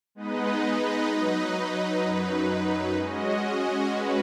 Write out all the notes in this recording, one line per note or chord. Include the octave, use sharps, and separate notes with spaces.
G#3 B3 D#4 B4 D#5
F#3 D#4 B4 D#5
F#2 F#3 D#4 B4
G#3 C#4 F#4 D#5
G#3 C#4 F#4 B4